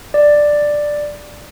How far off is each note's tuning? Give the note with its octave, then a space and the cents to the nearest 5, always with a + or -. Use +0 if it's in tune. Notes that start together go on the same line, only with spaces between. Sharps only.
D5 +5